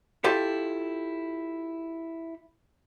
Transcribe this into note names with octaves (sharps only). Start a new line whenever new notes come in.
E4 F4 G4 A4 E5